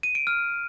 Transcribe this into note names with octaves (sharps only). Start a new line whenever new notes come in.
D#7
D7
F6